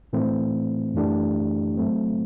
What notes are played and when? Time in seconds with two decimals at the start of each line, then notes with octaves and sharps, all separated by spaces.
0.13 A2 E3 A3 C4
0.95 F#2 E3 A3 D4 G4
1.78 G2 F#3 A3 C4